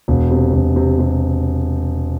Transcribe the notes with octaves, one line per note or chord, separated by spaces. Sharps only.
E1
C3
E1
C3
C3